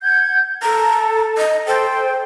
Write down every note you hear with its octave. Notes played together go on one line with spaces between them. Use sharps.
F#5 G6 G#6
A4 A#5
D#5
A4 C5 G5